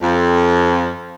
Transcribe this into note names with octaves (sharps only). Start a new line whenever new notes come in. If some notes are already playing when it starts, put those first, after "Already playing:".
F2